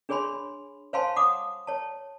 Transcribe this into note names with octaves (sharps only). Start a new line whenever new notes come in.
D4 G#4 C#5 G#5 B5 C6
C5 C#5 F5 G#5 A5 C6
F#5 D6 D#6
C#5 A5